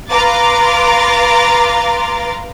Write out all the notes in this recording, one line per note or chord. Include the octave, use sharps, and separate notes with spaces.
B4 F5 A#5 C6 D6 A6